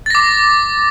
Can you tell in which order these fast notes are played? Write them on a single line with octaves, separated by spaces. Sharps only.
A6 A#6 D6